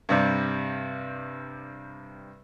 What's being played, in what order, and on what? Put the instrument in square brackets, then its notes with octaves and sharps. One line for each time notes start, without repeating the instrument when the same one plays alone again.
[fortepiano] G2 C3 G3